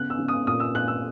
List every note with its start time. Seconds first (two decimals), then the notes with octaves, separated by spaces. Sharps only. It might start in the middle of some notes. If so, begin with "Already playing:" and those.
Already playing: C#3 B3 F#6
0.10 E6
0.19 C#3
0.28 D#6
0.47 A#2 D#6
0.60 E6
0.75 A#2 F#6
0.88 E6